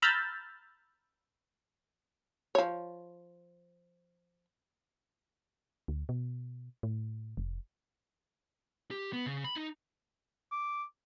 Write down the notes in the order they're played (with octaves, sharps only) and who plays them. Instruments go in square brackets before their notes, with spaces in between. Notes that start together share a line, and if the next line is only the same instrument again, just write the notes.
[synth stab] A#5 B5 E6 F6 G6 A6
[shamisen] F3 C#5
[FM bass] D2
B2
A2
F1
[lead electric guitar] G4
B3
C#3
B5
D#4
[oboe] D6